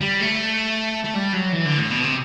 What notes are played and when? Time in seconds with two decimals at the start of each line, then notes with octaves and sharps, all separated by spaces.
0.01 G3
0.21 A3
1.05 A3
1.15 G3
1.34 F#3
1.53 E3
1.66 D3
1.78 A2
1.91 B2
2.03 C3